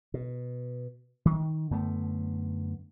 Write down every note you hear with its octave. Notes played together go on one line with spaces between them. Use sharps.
B2
D#3
F#2 D3 A3 B3